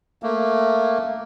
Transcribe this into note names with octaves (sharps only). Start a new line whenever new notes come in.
A3 A#3